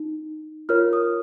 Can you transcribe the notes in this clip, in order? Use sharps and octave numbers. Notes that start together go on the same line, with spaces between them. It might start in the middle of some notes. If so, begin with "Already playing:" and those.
Already playing: D#4
F4 A#4 C#5 F6
D#6